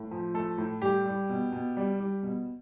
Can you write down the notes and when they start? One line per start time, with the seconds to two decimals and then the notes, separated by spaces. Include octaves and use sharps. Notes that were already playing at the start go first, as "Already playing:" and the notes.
Already playing: A2
0.11 F3
0.34 A3 A4
0.58 A2
0.82 G3 G4
1.06 G3
1.29 B2
1.52 B2
1.77 G3
2.00 G3
2.23 B2